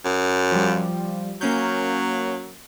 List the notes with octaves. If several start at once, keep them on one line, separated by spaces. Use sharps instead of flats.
F#2
F3 G3
F#3 A#3 C#4 G6